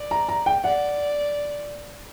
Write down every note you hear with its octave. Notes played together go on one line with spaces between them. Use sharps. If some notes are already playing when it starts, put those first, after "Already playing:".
Already playing: D5
A#5
A#5
G5
D5 F#5